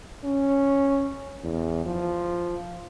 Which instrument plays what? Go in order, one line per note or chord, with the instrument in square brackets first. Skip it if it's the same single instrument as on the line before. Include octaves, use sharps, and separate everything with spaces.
[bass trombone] C#4
E2
F3